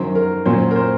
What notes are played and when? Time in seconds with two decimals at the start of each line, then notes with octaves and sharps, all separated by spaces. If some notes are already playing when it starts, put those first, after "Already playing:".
Already playing: F#2 D#3 F#3 C5
0.15 A#4
0.46 A#2 F#3 A#3 C#4 C5
0.71 A#4
0.76 C5